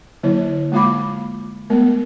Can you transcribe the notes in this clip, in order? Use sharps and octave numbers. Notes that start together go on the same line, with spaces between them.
D3 F#3 A#3 E4 C#5
G#3 A#3 F4 F5 B5 D6
G#3 A3 B3 A#4